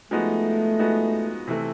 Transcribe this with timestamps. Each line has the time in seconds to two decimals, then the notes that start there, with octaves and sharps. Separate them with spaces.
0.11 F3 G#3 A3 B3 D#4 F#4
0.79 F3 G#3 B3 D#4 F#4
1.48 C3 E3 A3